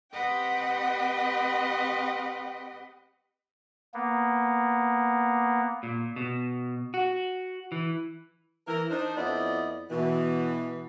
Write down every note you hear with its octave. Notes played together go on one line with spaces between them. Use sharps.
C4 G4 B4 D#5 F#5 G5
A#3 B3
A#2
B2
F#4
E3
E3 A#4
D4 D#4 C5
F2 F3 B3 E4 D5 D#5
B2 E3